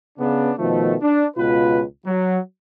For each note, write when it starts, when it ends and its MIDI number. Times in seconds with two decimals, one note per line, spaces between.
0.19 0.51 49
0.19 0.51 59
0.19 0.51 62
0.58 0.95 47
0.58 0.95 51
0.58 0.95 53
0.58 0.95 57
1.01 1.25 62
1.37 1.82 37
1.37 1.82 47
1.37 1.82 65
1.37 1.82 71
2.06 2.38 54